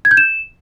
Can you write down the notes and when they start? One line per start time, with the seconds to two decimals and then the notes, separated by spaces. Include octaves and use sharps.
0.05 G#6
0.11 G6
0.17 E7